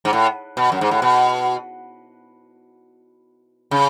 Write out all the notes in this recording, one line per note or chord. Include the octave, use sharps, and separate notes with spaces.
G#2
A2
B2
F#2
G#2
A2
B2
C#3